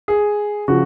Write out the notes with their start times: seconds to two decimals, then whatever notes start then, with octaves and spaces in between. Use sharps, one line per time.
0.08 G#4
0.68 C#3 F3 F#4